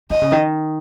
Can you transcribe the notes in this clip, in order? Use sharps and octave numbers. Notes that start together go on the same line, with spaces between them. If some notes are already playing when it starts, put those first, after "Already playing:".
D#3 D#5
C#3
D#3